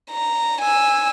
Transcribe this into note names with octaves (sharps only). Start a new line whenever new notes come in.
A#5
G#5 E6